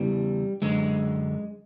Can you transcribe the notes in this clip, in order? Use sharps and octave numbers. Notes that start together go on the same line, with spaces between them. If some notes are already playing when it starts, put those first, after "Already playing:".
Already playing: E2 C#3 E3 G3
F#2 D3 G#3